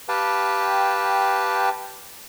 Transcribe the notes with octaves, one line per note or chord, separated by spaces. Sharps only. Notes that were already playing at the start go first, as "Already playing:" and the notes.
G4 B4 F5 G5 A5